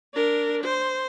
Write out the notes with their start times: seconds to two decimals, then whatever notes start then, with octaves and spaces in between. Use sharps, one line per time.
0.14 D4 A#4
0.64 C5